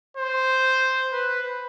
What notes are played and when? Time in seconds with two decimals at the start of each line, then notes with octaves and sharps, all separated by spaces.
0.17 C5
1.13 B4